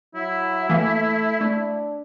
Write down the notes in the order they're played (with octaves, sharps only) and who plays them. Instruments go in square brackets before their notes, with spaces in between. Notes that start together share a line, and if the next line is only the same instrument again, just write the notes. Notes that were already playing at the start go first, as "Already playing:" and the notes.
[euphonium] F#3 [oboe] E4 [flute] E5
[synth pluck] E3 A#3 [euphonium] A3
[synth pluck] A3 [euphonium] D4